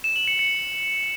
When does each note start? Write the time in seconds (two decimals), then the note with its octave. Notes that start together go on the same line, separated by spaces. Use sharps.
0.04 E7
0.16 F#7
0.28 C#7
0.39 C#7